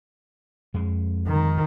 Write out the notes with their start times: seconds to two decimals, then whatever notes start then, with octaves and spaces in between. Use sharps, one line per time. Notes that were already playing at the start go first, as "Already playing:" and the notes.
0.74 F2 G#3
1.28 D#3